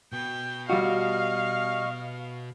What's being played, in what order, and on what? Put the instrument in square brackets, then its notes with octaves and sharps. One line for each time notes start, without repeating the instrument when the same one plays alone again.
[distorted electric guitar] B2 [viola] G5
[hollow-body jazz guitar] G3 F4 F#4 [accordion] D#5 C#6 F6 [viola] F5